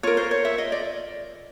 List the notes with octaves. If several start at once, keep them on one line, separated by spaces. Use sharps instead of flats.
F4 A#4 C#5
C5
C#5
E5
D#5
D5